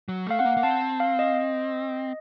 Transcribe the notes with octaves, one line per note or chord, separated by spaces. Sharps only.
F#3
A3 F5
C4 F#5
A#3
A#3
C4 A5
F5
D#5